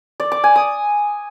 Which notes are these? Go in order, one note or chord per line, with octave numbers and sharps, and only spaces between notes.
D5
D6
G#5
D#6